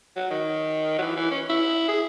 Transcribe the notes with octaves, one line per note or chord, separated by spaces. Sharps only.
F#3
D#3
F#3
E3
E3
C#4
E4
G#4